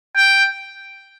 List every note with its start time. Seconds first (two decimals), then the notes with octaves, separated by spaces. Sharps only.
0.16 G5